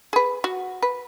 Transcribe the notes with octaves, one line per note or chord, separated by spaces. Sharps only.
G#4 B4
F#4
B4